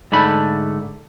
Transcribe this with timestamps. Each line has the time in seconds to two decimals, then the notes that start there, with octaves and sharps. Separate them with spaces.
0.12 G#2 D3 A3 B5